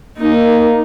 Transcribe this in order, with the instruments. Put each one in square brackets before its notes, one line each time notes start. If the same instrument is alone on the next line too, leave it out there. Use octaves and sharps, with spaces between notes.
[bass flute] A#3 [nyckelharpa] D#4